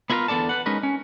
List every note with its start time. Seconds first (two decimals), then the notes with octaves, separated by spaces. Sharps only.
0.10 B3 E4 F4 A#4 B4 F5
0.28 E2 D3 B3 A4 D5 A5
0.49 B4 F#5
0.66 G#3 C#4 D#4 A#4 B4
0.83 C#4